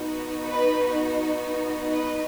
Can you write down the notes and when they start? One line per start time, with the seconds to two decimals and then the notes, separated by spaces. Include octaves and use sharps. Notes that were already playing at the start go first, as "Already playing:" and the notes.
Already playing: B3 D#4 F#4
0.49 B4
1.88 B4 D#5